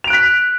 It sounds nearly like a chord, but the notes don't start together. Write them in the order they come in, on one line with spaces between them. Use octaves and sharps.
F7 D7 F#6 B6